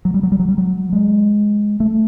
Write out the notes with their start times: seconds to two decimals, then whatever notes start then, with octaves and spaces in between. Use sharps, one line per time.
0.05 F#3
0.14 G3
0.23 F#3
0.32 G3
0.39 F#3
0.49 G3
0.58 F#3
0.93 G#3
1.80 A3